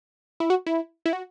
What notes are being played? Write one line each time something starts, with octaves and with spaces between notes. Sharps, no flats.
E4
F#4
E4
E4
F#4